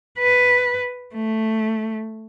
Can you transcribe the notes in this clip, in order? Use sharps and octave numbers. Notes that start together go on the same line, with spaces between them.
B4
A3